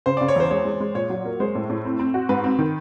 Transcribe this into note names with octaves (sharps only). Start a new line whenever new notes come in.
C#3 C5
C#3 D5
C#5
E2 C5
G#3 C#5
G#3
G#3
A#2 C#5
F#3
A#3
G#3 C5
A2
A2
C4
C4
F#4
G#2 B4
C4
D#3